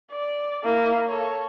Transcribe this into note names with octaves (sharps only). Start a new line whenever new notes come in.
D5
A#3 E4
A4 C#5